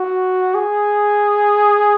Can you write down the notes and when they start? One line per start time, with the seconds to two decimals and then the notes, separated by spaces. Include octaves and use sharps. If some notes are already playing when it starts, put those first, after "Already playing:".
Already playing: F#4
0.54 G#4